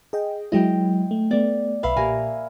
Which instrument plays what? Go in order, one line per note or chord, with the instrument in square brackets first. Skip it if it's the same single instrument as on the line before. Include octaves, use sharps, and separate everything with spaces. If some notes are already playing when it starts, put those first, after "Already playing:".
[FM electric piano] G#4 D#5 G5
[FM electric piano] F#3 G#3 E4 [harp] D#5 G5
[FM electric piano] A3
[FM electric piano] A3 B3 [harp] D5
[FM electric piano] B1 B4 D5 [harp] E5 F5 B5
[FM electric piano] A#2 G4 [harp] A#3 A#4 G#5